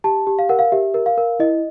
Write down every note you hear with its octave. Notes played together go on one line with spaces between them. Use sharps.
G4 A5
G4
F5
A#4 F#5
F5
G4 E5
A#4
F5
A#4
E4 D#5